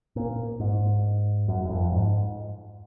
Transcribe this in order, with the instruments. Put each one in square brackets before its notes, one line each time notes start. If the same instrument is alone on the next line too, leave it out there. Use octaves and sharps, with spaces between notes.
[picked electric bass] A#2
G#2
F#2
F#2
F2
G#2